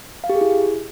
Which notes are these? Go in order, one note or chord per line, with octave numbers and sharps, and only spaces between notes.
F5
G4
G#4
E4